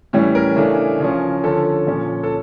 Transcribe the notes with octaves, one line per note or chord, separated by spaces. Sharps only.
A2 E3 G3 C#4
A#4
C#3 E3 A3 D4
C#3 F3 C#4
D3 F3 C#4 A4
A#2 F3 C#4
A4